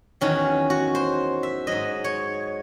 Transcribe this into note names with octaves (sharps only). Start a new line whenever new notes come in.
E2 D#3 F#3 C#4
F#4
C5
E5
G#2 F#3 D#5
C#5